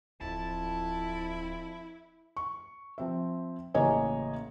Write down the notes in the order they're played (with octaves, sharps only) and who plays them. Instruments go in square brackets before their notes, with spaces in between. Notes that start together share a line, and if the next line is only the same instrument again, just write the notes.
[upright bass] D1 [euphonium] F2 [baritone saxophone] E4 [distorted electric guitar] A5
[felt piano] C#6
F3 C4 E5
A1 C#3 A#3 C#5 D#5 G#5